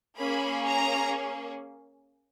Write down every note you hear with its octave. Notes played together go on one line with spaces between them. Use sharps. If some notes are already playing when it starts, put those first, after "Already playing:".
A#3 C#4 G#4 B5
A#5